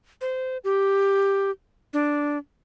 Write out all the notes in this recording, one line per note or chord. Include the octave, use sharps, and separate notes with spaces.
C5
G4
D4